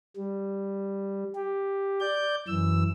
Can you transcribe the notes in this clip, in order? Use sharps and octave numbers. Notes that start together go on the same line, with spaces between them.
G3
G4
D5 G6
F#2 E3 E6